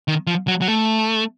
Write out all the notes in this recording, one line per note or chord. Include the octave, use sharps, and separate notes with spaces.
D#3
F3
F#3
F#3
A3